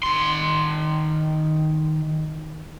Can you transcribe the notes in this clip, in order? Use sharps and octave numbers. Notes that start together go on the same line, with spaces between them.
D#3 C6